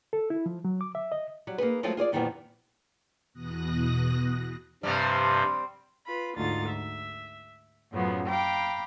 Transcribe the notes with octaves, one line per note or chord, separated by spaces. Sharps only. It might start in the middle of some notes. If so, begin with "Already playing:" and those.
A4
E4
F3
F#3
D6
E5
D#5
F#3 G3
A#3 D#4 G#4 B4
F3 F#3 G#3 A3 F4
F4 G#4 C#5 D5
F2 A#2 D#3 E3 G3 B3
E2 B2 D#6 F#6 A#6
G2 C3 F3 G3 C4
F4 B4 B5
D2 G#2 D#4 F4 A6
E5
F#2 A2 C#3 F3 F#3 B3
F5 G5 A#5 B5 D6